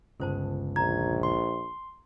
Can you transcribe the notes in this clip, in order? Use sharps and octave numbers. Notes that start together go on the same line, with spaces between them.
G1 C#2 A4 C5 A5
A#1 A#5 G#6
C6